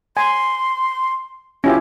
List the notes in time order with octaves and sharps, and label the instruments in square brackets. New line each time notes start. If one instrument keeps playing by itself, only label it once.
[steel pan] G#5 [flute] C6
[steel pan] C#4 E4 F4 [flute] G4